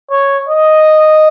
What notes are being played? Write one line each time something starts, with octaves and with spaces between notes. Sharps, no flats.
C#5
D#5